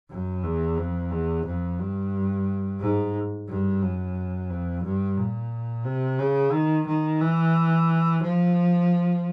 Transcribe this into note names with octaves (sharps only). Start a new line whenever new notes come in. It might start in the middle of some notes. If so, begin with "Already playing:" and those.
F#2
E2
F2
E2
F2
G2
G#2
G2
F#2
F2
G2
A#2
C3
C#3
D#3
D#3
E3
F3